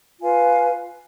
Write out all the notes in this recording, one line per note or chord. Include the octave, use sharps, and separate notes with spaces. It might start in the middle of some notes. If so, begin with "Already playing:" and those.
F4 B4 F5 G#5